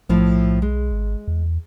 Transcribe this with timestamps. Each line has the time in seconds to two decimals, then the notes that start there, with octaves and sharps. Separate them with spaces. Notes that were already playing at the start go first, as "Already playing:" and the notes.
0.09 B1 A2 F3 E4
0.62 G#3
0.92 G#1
1.28 E2